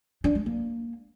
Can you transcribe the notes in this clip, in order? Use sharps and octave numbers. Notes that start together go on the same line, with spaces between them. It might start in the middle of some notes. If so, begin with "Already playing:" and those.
D4
G#3
A#3